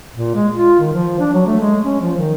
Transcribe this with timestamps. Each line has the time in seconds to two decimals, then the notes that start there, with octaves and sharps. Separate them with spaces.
0.15 A#2
0.34 G#3
0.53 F4
0.80 D#3
0.94 F3
1.20 D4
1.33 F#3
1.47 A3
1.61 G#3
1.84 C#4
2.01 F3
2.17 D#3